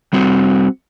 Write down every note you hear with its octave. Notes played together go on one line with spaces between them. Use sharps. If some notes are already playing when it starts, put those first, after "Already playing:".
G3 C4 F#4